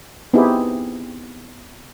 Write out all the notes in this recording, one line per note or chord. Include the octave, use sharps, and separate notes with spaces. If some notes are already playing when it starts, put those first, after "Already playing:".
B3 C4 D#4 E4 G4 G#4